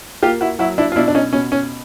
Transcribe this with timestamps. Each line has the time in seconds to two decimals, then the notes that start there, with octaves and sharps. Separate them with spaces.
0.23 A#3 F4 G4
0.41 E4 F#4
0.59 F#3 E4 F#4
0.78 D4 E4
0.92 F4
0.96 B2 D4 E4
1.08 D4
1.15 C#4 D#4
1.33 B2 C#4
1.52 C#4